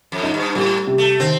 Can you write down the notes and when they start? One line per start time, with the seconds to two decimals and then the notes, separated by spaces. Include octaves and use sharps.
0.12 F2
0.23 D#4
0.34 G2
0.55 A2 G3
0.87 C3
0.98 A3
1.20 D#3 C4